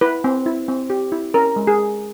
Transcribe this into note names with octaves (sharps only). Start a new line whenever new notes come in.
E4 B4
C4
E4
C4
G4
E4
C#4 A#4
G#3
G#4
G#3